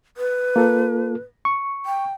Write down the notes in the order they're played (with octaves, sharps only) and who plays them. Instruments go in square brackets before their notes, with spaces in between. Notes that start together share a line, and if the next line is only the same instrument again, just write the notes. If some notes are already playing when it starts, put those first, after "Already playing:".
[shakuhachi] B4
[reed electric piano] A#3 F4 A4
C#6
[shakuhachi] G5